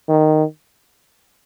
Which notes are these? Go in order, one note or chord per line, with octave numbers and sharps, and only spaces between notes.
D#3